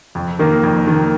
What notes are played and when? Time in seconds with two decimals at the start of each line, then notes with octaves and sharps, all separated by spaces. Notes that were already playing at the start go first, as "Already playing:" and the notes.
0.15 F2
0.39 D#3 A#3
0.63 F2
0.87 D#3 A#3